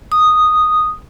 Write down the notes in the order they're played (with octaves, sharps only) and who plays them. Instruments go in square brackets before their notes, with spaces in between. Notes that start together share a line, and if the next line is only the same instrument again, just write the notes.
[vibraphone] D#6